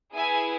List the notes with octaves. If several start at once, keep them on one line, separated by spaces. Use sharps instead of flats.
B3 E4 G#4 E5 G#5